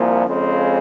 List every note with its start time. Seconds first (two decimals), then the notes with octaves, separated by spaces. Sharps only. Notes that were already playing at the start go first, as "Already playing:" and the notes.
Already playing: C2 A#2 F3 A#3
0.26 F2 C#3 G#3 C4